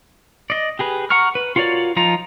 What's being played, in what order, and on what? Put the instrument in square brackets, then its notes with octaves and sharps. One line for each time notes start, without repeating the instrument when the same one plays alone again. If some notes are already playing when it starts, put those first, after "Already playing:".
[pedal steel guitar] D5 D#5
G4 G#4 B4
F#5 A#5 C#6 F6
B4
F4 F#4 A#4 C#5 D5
F3 D#4 F4 A#5